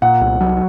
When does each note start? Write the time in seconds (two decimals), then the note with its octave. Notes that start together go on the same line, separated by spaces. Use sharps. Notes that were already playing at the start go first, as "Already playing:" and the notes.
0.02 A#2 F#5
0.21 C2
0.41 F#3